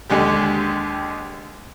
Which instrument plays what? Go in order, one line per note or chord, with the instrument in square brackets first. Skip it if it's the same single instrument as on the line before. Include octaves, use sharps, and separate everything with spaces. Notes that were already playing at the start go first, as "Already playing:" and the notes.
[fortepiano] D#2 D3 G#3 G4